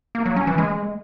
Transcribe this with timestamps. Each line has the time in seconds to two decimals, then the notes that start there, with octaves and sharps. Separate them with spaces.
0.15 A#3
0.26 F#3
0.36 C#4
0.47 E3
0.58 G#3